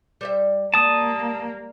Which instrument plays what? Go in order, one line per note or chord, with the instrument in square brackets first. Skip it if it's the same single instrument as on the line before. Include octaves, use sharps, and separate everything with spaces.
[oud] G3 C5 E5
[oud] G3 [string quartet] A#3 [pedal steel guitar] A5 D#6